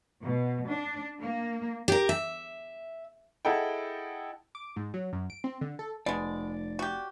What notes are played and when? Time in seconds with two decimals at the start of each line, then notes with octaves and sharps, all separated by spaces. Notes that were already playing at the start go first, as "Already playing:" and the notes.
0.23 B2
0.68 D4
1.20 A#3
1.88 G4 A#4
2.09 E5
3.45 E4 G#4 A4 D#5 F#5 G5
4.55 D6
4.76 G#2
4.94 F#3
5.13 F#2
5.30 D7
5.44 C4
5.61 D3
5.79 A4
6.06 F1 B2 G#3 D5
6.79 F#4 G4